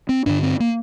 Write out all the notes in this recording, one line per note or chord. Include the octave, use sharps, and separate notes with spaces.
C4
G2 D3 D4
C4
A#3